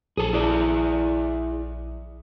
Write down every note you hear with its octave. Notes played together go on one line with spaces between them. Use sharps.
A#1 G#4 A4
E4 G#4 D5